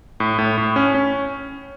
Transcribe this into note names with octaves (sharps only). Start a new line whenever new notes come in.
A2
A2
A2
C#4
C#4